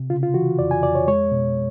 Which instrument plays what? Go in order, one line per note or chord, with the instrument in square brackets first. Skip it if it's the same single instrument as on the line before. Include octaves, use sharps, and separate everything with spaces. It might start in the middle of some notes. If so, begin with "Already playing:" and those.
Already playing: [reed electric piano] C3
C#3 F4
F4
E3 F#4
F2 D5
G#5
F2 D5
C#5
G#3 C#5
B2